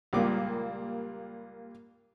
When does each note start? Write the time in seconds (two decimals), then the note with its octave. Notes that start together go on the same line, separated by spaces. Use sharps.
0.13 C#2 A#2 G3 A#3 D6